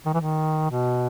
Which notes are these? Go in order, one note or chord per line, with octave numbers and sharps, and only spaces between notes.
D#3
E3
D#3
B2